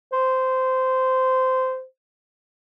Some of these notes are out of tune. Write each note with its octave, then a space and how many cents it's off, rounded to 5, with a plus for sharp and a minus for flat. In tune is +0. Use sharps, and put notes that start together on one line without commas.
C5 -15